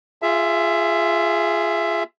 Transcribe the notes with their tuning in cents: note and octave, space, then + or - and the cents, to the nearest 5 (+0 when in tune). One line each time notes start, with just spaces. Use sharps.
F4 -10 G#4 +0 E5 +15